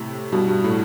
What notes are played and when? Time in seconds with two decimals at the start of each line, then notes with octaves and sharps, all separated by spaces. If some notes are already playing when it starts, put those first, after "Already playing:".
Already playing: A2 C3
0.32 G2 B2
0.48 G2
0.64 A2